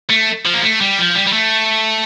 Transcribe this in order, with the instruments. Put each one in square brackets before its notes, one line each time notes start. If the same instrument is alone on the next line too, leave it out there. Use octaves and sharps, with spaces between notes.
[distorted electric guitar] A3
F3
A#3
A3
G3
F3
G3
G3
A3